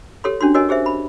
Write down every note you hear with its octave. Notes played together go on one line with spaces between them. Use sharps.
G4 A4 C#5 C6
C#4 D4 F#4 C6
F#4 A#4 C#5 D#5 G#5
G4 G#4 C5 E5
B5